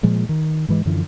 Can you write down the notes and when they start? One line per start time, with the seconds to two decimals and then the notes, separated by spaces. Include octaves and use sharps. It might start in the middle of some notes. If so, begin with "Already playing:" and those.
0.03 A#2 F3 G#3
0.29 D#3
0.68 G#2 E3 G#3
0.85 F#2 D3 E3 F3